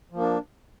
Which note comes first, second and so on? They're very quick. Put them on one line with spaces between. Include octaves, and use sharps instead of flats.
F3 A#3 D4